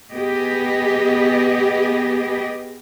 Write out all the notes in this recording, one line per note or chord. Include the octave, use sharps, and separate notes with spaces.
B3 G4 G#4 D#5